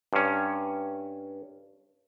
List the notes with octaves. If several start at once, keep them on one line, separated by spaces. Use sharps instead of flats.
G2 C#4